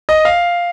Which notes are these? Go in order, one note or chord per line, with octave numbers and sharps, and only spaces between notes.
D#5
F5